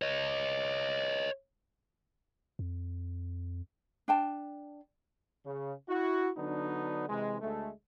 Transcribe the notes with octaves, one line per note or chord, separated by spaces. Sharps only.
C#5 D#5
F2
D4 G5 A5
C#3
E4 F#4
D3 F#3 B3 D4 D#4
C3 E3 G#3
D2 G#3 A3